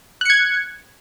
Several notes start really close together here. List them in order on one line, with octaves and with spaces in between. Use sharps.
F#6 C#7 G#6